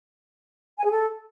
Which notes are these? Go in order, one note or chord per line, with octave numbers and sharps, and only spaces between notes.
G#5
G#4
A4